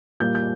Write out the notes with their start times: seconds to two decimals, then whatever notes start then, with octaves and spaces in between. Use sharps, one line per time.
0.20 A#2 G3 A#3 G6
0.35 G6